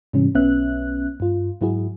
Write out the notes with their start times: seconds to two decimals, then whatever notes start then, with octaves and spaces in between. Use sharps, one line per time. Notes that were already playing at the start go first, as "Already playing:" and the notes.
0.13 G#2 C3 E3 G3 C#4
0.35 B1 B3 C#4 E5 F#6
1.20 G2 F4
1.61 G#2 F#3 E4 F#4 G#4